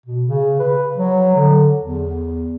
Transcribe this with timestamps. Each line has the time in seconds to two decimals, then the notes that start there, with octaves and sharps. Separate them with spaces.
0.06 B2
0.27 C#3
0.59 B4
0.97 F#3
1.36 D3
1.80 E2